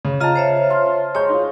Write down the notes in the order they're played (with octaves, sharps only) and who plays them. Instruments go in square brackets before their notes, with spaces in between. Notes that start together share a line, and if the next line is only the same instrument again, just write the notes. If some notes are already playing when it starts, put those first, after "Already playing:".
[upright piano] C#3
[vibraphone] F4 D#5 A#5 [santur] F5 A5
[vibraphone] C5 C#5 E5
[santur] F4
[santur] G#3 [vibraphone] C#5 C#6 [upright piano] A#5 G6
[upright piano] D#4 F4